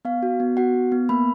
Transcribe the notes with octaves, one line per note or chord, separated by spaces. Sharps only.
B3 F5
F#4
B3
F#4 F#5
B3
B3
A#3 B5